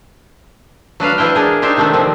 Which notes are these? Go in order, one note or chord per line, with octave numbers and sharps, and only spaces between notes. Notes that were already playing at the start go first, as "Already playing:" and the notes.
F#3 D4 B4 F5
E3 D4 E4 C5 G5
D4 G#4 A#4
D4 D#4 G4 C5 E5
C3 D#3 A3 C4 D4
A#2 D#3 F3 C4